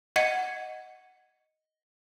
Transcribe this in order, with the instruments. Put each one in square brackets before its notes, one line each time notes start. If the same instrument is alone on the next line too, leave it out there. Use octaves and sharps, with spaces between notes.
[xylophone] D#5 F#5 G#6 C#7 D#7